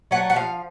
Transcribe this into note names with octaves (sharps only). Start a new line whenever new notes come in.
F#3 A3 F#5
F#5
F3 F5